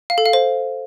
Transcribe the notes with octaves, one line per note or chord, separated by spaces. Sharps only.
F5
A4
F5
C5